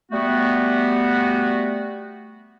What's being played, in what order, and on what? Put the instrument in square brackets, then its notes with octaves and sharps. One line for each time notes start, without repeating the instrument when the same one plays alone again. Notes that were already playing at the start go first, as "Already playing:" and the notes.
[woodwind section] G3 A3 B3 F#4